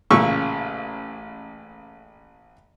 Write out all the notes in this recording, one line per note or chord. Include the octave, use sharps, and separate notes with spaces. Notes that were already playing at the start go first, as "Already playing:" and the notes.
A1 A#2 C#3 C#6 E6